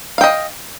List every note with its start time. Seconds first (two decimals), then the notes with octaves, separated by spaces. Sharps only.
0.18 F5
0.21 G5
0.24 D#5